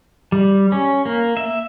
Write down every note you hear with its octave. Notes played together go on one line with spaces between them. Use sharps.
G3
C#4
A#3
E5